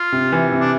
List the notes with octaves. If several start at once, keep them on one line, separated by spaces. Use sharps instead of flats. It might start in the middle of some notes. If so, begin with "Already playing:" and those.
Already playing: F4
C3
E3
C3
D4